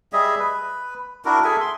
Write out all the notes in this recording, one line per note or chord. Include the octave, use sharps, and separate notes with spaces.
G3 G#4 D#5 E5
B4
D4 E4 F#4 A#4
G#4 A4 E5 G#5
C6